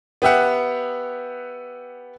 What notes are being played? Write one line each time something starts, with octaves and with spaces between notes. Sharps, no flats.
B3 G4 E5 F#5